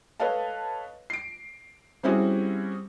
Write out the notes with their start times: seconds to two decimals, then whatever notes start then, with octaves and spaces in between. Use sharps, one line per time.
0.20 A4 B4 C#5 D#5 F5 A5
1.10 C7 D7
2.03 G3 C4 C#4 E4 F#4 G#4